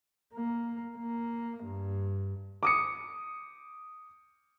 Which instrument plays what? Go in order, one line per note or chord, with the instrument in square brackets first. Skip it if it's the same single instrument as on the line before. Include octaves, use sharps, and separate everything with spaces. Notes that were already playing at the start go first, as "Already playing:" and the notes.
[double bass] A#3
A#3
G2
[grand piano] D6 D#6 C#7